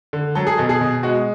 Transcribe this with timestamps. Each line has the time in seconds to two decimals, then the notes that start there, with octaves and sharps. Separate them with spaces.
0.13 D3
0.35 F#3 A4
0.47 G#4
0.58 B2 A4
0.69 G#4
0.81 B2
1.03 G#3 F#4